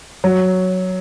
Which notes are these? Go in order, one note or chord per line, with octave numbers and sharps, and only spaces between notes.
F#3